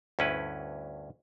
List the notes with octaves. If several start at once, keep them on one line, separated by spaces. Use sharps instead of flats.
D2 G2 C#4 E4 B4